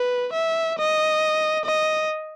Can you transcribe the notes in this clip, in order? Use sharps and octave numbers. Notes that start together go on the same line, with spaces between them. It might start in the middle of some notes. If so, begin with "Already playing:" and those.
Already playing: B4
E5
D#5
D#5